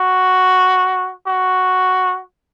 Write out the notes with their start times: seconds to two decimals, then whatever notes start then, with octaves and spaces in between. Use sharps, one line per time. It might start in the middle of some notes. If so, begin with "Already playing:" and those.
Already playing: F#4
1.27 F#4